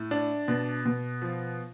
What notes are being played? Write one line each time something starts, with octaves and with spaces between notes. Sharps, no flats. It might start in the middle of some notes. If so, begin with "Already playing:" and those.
Already playing: A2
D4
B2
B2
F3